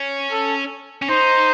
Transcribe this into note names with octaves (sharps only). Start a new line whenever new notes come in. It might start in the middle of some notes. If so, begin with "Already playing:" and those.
Already playing: C#4
A4
C#4
D#4 C5